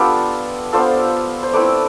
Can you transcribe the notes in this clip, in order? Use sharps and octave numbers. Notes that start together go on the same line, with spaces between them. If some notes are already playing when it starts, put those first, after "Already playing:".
Already playing: B3 D4 F4 G4 A4 B4
B3 D4 F4 A4 C5
C5
A3 C4 E4 B4 D5